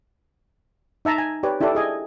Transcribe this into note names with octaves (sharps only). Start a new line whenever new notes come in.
D#4 E5 A5 A#5
G#5
G4 B4 C#5 D5
D4 E4 G4 A4 D5
G#4 D#5 G#5